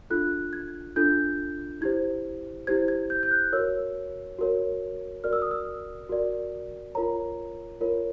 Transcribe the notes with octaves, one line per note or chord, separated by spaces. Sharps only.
D4 F4 A4 F#6
G#6
D4 F4 A4 G6
E4 G4 C5 G#6
E4 G4 C5 G#6
G#6
G6
G6
F#6
F#4 A#4 C#5 E6
F#4 A#4 C#5
F#4 A#4 D5 F6
E6
D#6
E6
F#4 A#4 D5
F4 A#4 C#5 A#5
F4 A#4 C#5